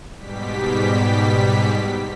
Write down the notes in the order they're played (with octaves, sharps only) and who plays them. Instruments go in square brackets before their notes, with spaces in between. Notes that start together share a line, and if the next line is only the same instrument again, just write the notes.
[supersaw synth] G#2 B2 G3 G4 B6